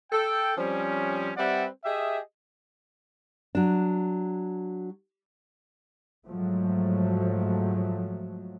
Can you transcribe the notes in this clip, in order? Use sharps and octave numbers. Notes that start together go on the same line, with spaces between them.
A4 G5
F3 G3 C4 C#4
G3 C4 B4 D5 E5 F#5
G4 G#4 D#5 E5
F#3 D4
G#2 F3 F#3 A3